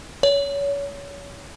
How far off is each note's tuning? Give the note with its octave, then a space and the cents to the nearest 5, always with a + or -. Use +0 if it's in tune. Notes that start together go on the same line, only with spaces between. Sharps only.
C#5 +30